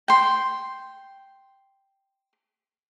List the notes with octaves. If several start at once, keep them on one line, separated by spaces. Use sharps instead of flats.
G5 C6